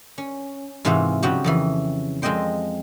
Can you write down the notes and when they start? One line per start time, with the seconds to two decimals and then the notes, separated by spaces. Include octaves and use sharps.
0.18 C#4
0.85 G#2 C3 E3 F4 F#4 G#4
1.23 C#3 F3 F#3 F#4 G4
1.44 F2 C#3 E3
2.22 F2 G#3 C4 D#5 G5 C6